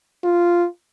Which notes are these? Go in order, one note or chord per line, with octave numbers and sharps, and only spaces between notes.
F4